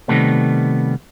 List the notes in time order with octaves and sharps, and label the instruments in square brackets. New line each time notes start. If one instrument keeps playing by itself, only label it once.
[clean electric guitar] C3 D#3 G3 A3 B3